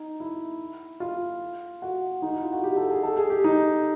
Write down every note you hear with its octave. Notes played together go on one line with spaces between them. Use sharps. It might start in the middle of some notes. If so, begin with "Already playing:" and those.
Already playing: D#4
E4
F4
F#4
D#4
E4
F4
F#4
G4
A4
G#4
A4
G#4
G4
D#4